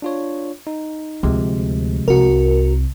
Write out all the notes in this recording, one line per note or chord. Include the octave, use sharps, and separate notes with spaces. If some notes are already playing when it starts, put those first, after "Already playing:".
D4 F4 C#5
D#4
D2 C3 F3 G#3
C2 F#4 A#4